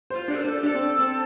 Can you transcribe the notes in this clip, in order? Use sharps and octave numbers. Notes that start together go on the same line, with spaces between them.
C5
F4
D4
C5
D4
A4
G4
D4 A4
C4
C4